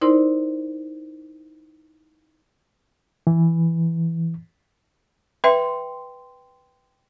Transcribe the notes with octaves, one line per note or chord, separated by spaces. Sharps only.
D#4 E4 A#4 C5 D5 C6
E3
B4 E5 G5 C6